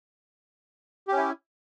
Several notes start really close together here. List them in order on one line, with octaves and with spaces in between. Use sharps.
G4 C#4 E4